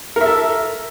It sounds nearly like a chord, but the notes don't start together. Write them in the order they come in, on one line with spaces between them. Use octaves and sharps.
A#4 E5 A4